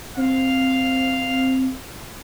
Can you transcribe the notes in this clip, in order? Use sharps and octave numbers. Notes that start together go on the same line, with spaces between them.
C4 F5